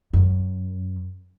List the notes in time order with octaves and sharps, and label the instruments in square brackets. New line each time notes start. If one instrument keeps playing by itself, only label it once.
[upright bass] F#2